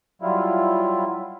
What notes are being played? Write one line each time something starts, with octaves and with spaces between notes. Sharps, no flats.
F#3 G3 E4 F4